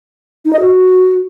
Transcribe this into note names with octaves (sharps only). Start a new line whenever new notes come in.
D#4
D#5
F#4